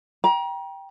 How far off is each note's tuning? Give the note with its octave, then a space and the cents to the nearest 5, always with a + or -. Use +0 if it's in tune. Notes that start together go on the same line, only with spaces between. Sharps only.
G5 +0 A#5 +35